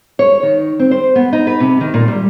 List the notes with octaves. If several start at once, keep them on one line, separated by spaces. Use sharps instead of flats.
C#5
D#3
C4
C5
B3
D#4
B4
C3
D#3
A#2
G3